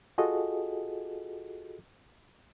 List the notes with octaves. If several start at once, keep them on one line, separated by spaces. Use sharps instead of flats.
F4 F#4 G#4 A4 D#5